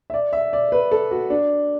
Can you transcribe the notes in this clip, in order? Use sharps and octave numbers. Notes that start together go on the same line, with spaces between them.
E5
D5
E5
D5
B4
A4
F#4
D4